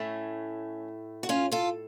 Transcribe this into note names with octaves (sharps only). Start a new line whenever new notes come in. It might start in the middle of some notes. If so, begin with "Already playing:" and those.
Already playing: A2 A3 C#4
F#4
C#4 F4
F4 A4